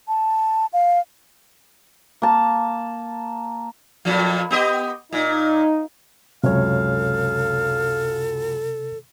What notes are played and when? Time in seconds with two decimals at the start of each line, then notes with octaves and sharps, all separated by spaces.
0.08 A5
0.73 F5
2.22 A#3 A5
4.05 F2 A#2 F3
4.51 B3 G4 D#5
5.13 A#2 D#4
6.44 C#2 F#2 C3 A4 C#5 F5